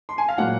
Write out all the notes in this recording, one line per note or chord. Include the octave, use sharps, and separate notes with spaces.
C6
G#5
F5
A#2 F#3 A#3 F#5